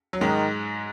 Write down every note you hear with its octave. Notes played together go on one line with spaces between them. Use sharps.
F#3
G#2 D#3 G#3